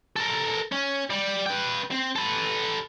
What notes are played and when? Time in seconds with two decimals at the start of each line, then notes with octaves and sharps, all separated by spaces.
0.16 A4 A#4
0.72 C#4
1.10 G3
1.46 B4 G5
1.91 C4
2.16 A4 B4